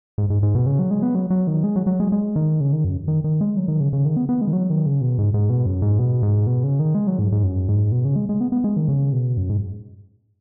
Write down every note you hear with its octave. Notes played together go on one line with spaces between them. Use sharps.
G#2
G#2
G#2
B2
C#3
F#3
G#3
B3
F#3
F#3
D#3
G#3
F#3
F#3
G#3
G#3
D#3
C#3
D#3
F#2
D#3
D#3
G#3
F#3
D#3
C#3
C#3
D#3
B3
B3
G#3
D#3
F#3
D#3
C#3
B2
G#2
G#2
B2
F#2
G#2
B2
G#2
B2
C#3
D#3
G#3
F#3
G#2
G#2
F#2
G#2
B2
C#3
G#3
G#3
B3
B3
G#3
D#3
C#3
B2
F#2
G#2